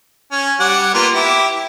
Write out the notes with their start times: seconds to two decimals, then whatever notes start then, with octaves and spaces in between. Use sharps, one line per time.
0.32 C#4
0.60 G3 F#5
0.94 A#3 B3 F4
1.14 E4 G4